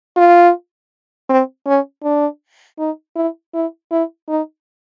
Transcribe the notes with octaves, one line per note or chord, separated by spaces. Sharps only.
F4
C4
C#4
D4
D#4
E4
E4
E4
D#4